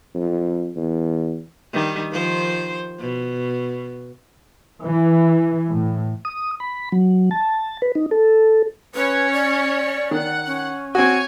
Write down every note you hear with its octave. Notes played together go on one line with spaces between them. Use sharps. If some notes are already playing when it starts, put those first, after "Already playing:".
F2
E2
D#3 G3
D#3 F3 C5
B2
E3
A2
D#6
B5
F#3
A5
B4
D#4
A4
C#4 B4 C#5
D5
D#3 F#5
C#4
C4 F#4 C#5 G#5